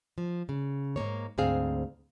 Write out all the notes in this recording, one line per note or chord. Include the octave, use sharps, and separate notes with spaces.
F3
C#3
G#2 G#3 A#3 C#5
D2 G#2 C4 G#4 F5